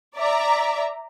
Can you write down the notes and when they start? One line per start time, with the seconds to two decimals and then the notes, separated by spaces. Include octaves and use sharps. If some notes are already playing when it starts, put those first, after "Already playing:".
0.16 D5 E5 A#5